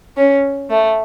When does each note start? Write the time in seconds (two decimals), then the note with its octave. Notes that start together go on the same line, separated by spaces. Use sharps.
0.17 C#4
0.70 A3